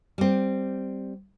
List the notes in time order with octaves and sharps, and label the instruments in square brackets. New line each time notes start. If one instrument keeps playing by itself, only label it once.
[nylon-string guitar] G3 C4